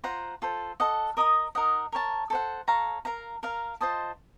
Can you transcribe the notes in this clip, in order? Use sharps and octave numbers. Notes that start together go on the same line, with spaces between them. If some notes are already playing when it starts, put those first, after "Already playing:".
F4 C5 F#5 A#5
F4 A4 C5
A4 D#5 F#5
A#4 D#5 A#5 D#6
D#4 A#4 D#5 F#5
A#4 C#5 A5
A4 C5 F#5
A4 C#5 F5 A#5
A#4 F5 A#5
A#4 F5 A#5
F4 C5 D#5 A5